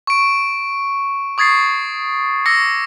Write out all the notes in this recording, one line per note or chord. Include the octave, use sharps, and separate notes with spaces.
C#6 D7
C#6 D#6 G#6 A6 C7
C#6 D6 E6 A#6 C#7